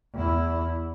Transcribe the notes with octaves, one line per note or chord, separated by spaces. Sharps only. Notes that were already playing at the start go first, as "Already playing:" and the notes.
E2 E4